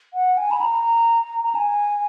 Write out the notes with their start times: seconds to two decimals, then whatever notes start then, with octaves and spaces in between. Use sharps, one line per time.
0.14 F#5
0.37 G#5
0.51 B5
0.61 A#5
1.45 A#5
1.55 G#5